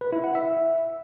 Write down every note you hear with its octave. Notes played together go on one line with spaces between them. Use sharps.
B4
E4
F#5
E5